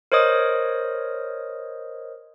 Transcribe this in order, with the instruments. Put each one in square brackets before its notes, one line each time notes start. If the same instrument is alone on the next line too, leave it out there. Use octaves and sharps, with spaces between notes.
[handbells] A#4 C5 C#5 D#5 D#6